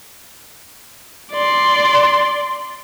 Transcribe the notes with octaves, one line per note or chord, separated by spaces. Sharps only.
D5 C6